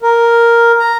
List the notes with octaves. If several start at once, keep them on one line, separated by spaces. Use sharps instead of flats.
A#4
A#5